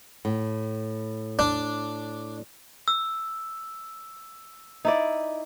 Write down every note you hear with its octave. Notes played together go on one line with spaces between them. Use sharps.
A2
D4
E6
D#4 E4 D5